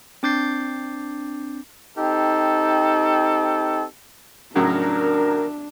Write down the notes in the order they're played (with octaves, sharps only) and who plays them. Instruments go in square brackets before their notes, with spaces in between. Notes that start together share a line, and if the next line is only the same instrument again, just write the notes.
[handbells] C4 D4 D6 G6 A6 C7
[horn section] C4 D#4 G4 A4
[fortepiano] A2 C#3 F#3 [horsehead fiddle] D4 [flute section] A#4